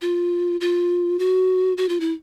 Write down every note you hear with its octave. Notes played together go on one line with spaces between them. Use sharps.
F4
F4
F#4
F#4
F4
E4